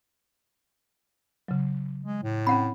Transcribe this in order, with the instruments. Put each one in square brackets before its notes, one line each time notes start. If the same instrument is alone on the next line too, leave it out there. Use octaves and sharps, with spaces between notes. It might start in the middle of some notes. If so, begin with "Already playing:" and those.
[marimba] C#3 F#3
[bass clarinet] G#3
A2
[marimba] C4 [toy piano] C#4 F#5 B5